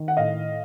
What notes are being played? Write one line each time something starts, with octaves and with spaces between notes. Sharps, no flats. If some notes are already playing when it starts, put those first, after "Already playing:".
Already playing: D#3
F#5
A2 D#5 F5